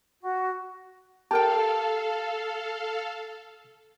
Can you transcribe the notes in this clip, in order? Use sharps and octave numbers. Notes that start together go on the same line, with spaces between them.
F#4
G4 A4 A#4 F5 G5 A5